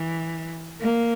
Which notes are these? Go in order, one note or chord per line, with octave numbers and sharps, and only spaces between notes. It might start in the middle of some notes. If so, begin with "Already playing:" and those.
Already playing: E3
A#3